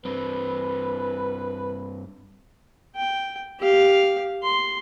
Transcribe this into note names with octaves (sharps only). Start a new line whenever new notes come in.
G2 C4 B4
G5
G4 F5
C6